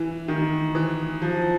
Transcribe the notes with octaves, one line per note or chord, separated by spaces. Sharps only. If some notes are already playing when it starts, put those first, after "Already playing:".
Already playing: E3
D#3
E3
F3